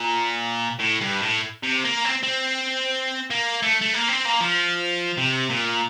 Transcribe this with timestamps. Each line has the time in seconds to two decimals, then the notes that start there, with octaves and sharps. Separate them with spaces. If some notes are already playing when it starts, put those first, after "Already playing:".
Already playing: A#2
0.80 A2
1.01 G2
1.22 A2
1.63 C3
1.84 A#3
2.05 C4
2.23 C4
3.30 A#3
3.62 A3
3.81 A3
3.94 A#3
4.08 C4
4.25 A#3
4.40 F3
5.18 C3
5.50 A#2